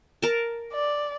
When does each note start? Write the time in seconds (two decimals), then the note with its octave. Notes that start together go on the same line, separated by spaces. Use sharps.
0.22 A#4 A5
0.73 D5